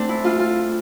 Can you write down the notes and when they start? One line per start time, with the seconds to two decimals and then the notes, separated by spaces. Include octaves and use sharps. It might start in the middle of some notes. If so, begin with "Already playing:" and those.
Already playing: A3 C4 D4
0.09 E4
0.24 F4
0.40 F4